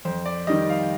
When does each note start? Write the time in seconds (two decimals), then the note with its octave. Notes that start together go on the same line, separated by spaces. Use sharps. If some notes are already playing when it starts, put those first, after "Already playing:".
0.05 F2 C5
0.26 D5
0.47 D#3 G3 D#5
0.69 F5